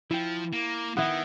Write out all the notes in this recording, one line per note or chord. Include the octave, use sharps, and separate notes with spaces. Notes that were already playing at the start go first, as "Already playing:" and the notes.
F3 E4 G5
A#3
D#3 B3 E4